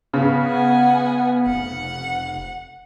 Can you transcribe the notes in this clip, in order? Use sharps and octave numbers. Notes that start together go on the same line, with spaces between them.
C#3 B3
F#5 G#5
F1 F#5